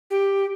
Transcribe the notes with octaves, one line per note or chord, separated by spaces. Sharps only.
G4